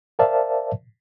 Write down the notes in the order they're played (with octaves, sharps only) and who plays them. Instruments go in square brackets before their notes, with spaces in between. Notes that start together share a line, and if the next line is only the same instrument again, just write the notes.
[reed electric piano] A#4 C5 D5 E5 F5 A5